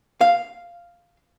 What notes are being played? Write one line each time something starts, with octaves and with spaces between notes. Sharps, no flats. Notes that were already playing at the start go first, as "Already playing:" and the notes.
F5